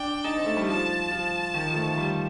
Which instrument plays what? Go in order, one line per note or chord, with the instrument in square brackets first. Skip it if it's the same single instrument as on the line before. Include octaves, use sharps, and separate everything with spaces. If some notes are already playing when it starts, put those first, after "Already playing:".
Already playing: [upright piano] D4 [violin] G5
[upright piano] D#4 [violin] A5
[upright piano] C4
A3
G3
[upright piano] F3 [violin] A5
[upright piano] F3
D#3
F3
A3
F3
G3